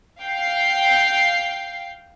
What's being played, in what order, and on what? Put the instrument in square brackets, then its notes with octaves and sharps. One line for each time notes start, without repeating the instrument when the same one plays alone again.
[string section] F5 G5 C7